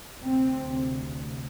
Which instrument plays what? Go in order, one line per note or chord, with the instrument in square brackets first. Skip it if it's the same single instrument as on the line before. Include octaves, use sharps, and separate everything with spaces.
[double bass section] D2 C3 C4